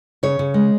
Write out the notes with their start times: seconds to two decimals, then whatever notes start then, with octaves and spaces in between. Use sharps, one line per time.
0.23 C#3 C#5
0.39 C#3
0.54 G#3